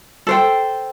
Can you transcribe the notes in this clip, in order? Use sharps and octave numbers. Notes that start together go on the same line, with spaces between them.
A4 C5 G5